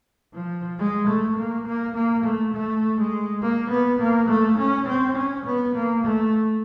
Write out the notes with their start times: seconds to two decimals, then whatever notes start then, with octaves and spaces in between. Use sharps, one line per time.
0.34 F3
0.79 G#3
1.07 A3
1.37 A#3
1.66 A#3
1.95 A#3
2.24 A3
2.54 A3
2.97 G#3
3.41 A#3
3.70 B3
3.99 A#3
4.29 A3
4.58 C#4
4.87 C4
5.17 C#4
5.46 B3
5.75 A#3
6.04 A3